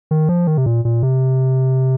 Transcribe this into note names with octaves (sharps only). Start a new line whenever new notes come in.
D#3
F3
D#3
C3
A#2
A#2
C3